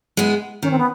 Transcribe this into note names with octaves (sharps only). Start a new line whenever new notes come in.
G#3 B3 E4
D#3 C#4
C4
B3